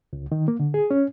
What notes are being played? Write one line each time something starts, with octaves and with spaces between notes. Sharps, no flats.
C#2
D#3
A#3
D3
G#4
C#4